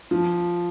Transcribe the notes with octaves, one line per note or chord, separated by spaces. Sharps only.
F3